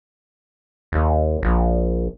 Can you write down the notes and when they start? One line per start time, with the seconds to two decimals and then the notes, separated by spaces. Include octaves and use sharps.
0.92 D#2
1.43 A#1